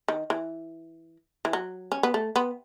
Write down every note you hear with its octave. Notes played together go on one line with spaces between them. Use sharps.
D#3
E3
E3
F#3
C#4
B3
A3
B3